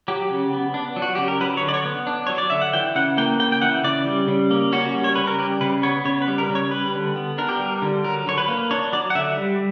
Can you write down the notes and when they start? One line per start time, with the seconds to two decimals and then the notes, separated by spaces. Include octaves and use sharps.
0.08 F#3 G4
0.30 C#3
0.53 B3
0.74 D4
0.96 F#3
1.02 F#4
1.15 C#3 G4
1.28 A#4
1.41 F#3 B4
1.57 C#5
1.63 D3
1.68 D5
1.74 C#5
1.85 B3
2.07 D4
2.27 F#3 C#5
2.38 D5
2.50 D3 E5
2.62 F#5
2.73 E3 G5
2.95 C#3 F#5
3.18 A#3 G5
3.40 C#3 G5
3.52 G5
3.62 E3 F#5
3.84 C#3 D5
4.06 G3
4.28 C#3
4.51 A#3
4.72 C#4 F#4
4.94 G3
5.04 C#5
5.15 C#3 B4
5.27 A#4
5.39 G3 G4
5.61 C#3 B4
5.83 B3 C#5
6.05 C#3 C#5
6.22 B4
6.28 G3
6.38 A#4
6.49 C#3
6.55 C#5
6.71 G3 B4
6.94 D3
7.16 B3
7.38 D4 A#4
7.49 G4
7.60 G3 A#4
7.82 D3
8.04 F#3 A#4
8.27 D3 C#5
8.38 B4
8.48 A#3
8.71 D4 C#5
8.93 F#3 D5
9.10 F#5
9.15 D3 E5
9.37 G3